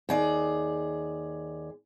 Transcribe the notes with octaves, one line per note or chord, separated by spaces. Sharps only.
D#2 G#4 D5